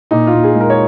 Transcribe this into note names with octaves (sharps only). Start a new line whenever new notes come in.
A#2 D#4
F4
A#2
G#4
G#3
A#4
C#5